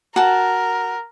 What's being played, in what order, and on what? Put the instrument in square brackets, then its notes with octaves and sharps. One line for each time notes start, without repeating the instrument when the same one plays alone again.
[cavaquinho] F#4 A5 [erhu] A#4